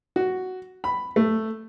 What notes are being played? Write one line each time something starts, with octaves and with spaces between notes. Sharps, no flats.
F#4
B5
A3